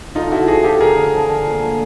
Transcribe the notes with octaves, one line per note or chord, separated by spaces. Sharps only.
D3 D#4 F4
D3 E4 F#4
F3 F#4 G#4
F3 G4 A4
D3 G#4 A#4
D3
F3
D3
A#2
A#2